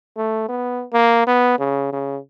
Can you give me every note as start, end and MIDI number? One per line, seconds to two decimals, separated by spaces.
0.17 0.48 57
0.49 0.84 59
0.93 1.23 58
1.27 1.57 59
1.59 1.89 49
1.92 2.18 49